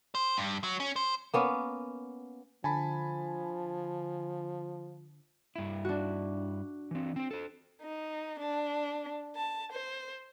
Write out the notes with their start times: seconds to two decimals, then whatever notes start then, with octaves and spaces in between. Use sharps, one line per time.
0.15 C5
0.37 G2
0.64 F#3
0.80 C#4
0.96 C5
1.34 A#3 B3 C#4
2.64 D3 F3 G#5 A5 B5
5.56 G2 E4
5.85 D4 F#4
6.91 E3 C4
7.16 C4 C5
7.31 A4 C5
7.81 D#4
8.39 D4
9.36 A5
9.72 C5